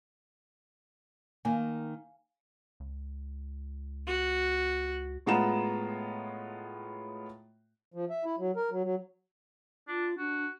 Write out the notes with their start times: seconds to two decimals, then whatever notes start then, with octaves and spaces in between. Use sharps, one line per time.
1.45 D#3 A#3 F5 G#5
2.80 C#2
4.07 F#4
5.26 A2 G#3 B3 F4 A#5 E7
7.94 F3
8.10 E5
8.25 E4
8.39 F#3
8.56 A#4
8.71 F#3
8.84 F#3
9.88 D4 F4
10.18 D4 F#4